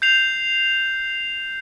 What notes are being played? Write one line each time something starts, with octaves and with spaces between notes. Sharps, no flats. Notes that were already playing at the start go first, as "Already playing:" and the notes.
G6 C7 F7